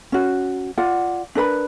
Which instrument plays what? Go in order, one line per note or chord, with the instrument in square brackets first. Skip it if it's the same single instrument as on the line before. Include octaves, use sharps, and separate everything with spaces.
[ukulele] C#4 F#4
F4 D5 F#5
D4 A#4 B4 B5